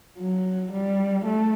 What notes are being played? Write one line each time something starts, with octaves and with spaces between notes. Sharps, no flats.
F#3
G3
A3